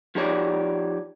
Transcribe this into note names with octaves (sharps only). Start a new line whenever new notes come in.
F3 D#4 G4 C#5 D5